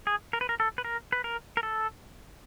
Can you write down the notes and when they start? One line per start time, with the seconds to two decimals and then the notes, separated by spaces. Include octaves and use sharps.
0.07 G#4
0.33 A#4
0.41 B4
0.49 A#4
0.60 A4
0.78 B4
0.85 A#4
1.13 B4
1.24 A#4
1.57 A#4
1.63 A4